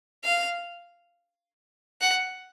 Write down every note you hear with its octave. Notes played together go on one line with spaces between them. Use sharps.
F5
F#5